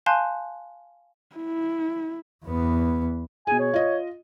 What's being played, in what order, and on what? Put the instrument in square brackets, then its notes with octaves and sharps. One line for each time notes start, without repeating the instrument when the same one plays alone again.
[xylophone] F5 G#5 A5 C6 F#6 G6
[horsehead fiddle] E4
[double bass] E2 B3
[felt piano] B2 G#4 [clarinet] G#5
[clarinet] C#5
[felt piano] F4 D#5